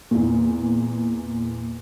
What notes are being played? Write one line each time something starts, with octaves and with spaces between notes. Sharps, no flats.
E2 A#2